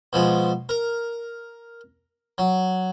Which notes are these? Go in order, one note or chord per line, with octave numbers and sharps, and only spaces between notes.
B2 F3 G#3
A#4
F#3